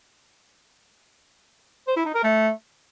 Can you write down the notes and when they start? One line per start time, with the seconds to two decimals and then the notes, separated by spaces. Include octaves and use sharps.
1.87 C5
1.96 E4
2.05 D#4
2.14 A#4
2.23 A3